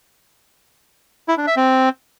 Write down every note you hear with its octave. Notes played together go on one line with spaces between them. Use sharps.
E4
D4
E5
C4